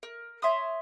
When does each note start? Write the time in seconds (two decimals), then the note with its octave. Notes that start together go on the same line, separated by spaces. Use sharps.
0.03 A#4
0.42 C#5 E5 C6 D#6